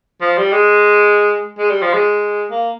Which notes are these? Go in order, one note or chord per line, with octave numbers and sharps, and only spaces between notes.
F3
G3
G#3
G#3
G3
F3
G#3
A#3